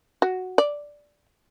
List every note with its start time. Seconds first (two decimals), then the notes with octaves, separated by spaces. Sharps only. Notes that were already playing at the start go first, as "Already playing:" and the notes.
0.22 F#4
0.58 D5